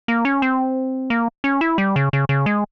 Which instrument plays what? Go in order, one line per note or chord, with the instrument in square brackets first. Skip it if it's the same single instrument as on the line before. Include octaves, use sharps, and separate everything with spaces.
[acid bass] A#3
C#4
C4
A#3
C#4
E4
G3
C#3
C#3
C#3
G#3